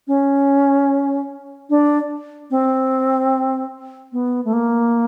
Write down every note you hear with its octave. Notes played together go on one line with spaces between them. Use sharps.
C#4
D4
C4
B3
A3
A#3